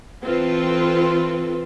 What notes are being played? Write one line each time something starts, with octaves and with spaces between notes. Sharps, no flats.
E3 C4 F4 A4 B4